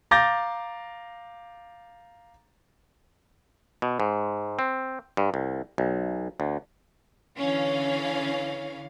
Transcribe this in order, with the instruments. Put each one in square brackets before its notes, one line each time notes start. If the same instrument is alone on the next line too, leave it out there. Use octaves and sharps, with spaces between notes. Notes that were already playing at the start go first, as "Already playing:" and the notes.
[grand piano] F5 A#5 D6 G6 A6 A#6
[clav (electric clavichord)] B2
G#2
C4
G2
C2
B1
D2
[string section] D3 E3 C#4 F5